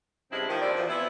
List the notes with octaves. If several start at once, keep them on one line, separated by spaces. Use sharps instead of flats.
G2 C#3 G3 G#3 C4 E4
D#3 F3
D#2 F3 D4 E4 D5
E2 B2 E3 F3
E3 B3 C4 E4